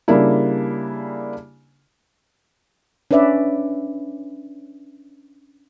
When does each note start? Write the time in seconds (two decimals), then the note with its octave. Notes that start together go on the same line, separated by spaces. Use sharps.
0.08 C#3 G3 A#3 D4 E4
3.11 C#4 D4 B4 D5 E5